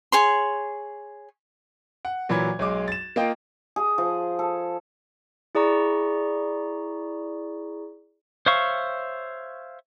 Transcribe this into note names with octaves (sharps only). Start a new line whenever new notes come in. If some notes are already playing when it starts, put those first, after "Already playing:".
G#4 C#5 C6
F#5
A#2 E3 F#3 B5 G#6
B1 G#3 D6
A6 E7
A#3 F4 D#5 G5
G#4
F3
A4
E4 G#4 D5 A#5 C#6
C5 C#5 E5 F5 C#6